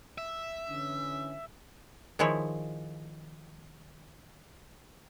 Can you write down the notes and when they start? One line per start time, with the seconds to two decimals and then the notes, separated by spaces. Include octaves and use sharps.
0.18 E5
0.69 D3 E3 C#4
2.19 D#3 F3 G#3 E4 C#5